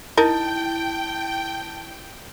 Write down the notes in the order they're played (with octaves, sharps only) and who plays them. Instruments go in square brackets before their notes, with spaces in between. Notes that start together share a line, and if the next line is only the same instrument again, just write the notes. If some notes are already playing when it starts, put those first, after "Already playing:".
[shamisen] D#4 A#4 [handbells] E4 [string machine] G5 [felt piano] A5